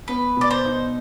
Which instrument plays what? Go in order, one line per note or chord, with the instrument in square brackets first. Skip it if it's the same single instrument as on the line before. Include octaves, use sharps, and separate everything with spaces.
[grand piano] B3 [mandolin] B4
[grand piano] B2 [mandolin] D5
[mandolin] C5
[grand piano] D#4